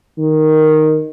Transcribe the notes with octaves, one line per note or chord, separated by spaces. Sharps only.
D#3